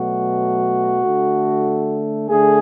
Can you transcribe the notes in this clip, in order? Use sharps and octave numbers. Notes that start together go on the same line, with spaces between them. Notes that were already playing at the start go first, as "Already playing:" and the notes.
Already playing: B2 F#3 A3 F#4
D3 A3
D3 A3 G#4